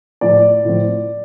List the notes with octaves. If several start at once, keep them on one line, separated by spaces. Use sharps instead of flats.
A2 F3 D5
A2 F3